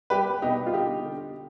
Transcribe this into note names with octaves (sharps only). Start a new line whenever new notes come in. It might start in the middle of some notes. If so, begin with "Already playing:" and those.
G3 G4 B4
B2 D#4 G4
F4
D3 D#4 G4
D3